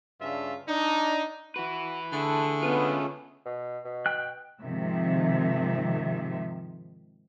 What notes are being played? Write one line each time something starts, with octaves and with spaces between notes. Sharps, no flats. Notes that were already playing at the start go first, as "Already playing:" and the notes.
G2 C#3 D4 F4 E5
D4 D#4
E4 F#4 B4
D3 A3 G#4 A4
B3 C#4 F4
B2
B2
G5 F#6
G#2 C3 D#3 F3 E5